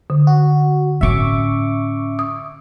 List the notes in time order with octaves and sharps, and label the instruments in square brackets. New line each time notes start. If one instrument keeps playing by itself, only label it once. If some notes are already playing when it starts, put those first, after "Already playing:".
[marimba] D3
[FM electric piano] F#4
[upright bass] A2 C#4 [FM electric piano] E5 C#6 D6
[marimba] D#6